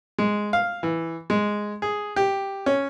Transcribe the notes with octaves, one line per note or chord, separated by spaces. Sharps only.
G#3
F5
E3
G#3
G#4
G4
C#4